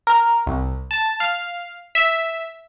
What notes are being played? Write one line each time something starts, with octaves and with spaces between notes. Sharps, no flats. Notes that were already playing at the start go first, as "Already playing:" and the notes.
A#4
C2
A5
F5
E5